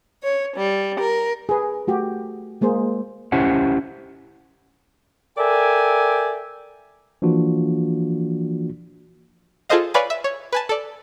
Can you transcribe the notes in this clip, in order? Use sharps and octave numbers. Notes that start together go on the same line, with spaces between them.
C#5
G3
A#4
G#4 B4
A3 F#4 G4
G#3 A#3 G#4 C5
C#4 E4 G4 C5 F#5
A4 A#4 D5 E5 G5 G#5
E3 F3 A#3 D4 F4 F#4
F4 G#4 A4 C5 D#5 F5
B4 C#5 D5 F5 G#5 B5
E5
C#5
B4 G#5 A5
A4 D5